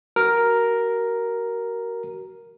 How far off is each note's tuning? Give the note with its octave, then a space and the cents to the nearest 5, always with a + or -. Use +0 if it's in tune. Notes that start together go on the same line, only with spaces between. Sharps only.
F#4 +30 A#4 +0